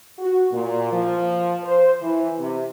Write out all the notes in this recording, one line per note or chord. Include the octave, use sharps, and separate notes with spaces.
F#4
A#2
F3
C5
E3
C3